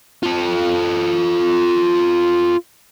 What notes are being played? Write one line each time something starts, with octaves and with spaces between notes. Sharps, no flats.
F4 A4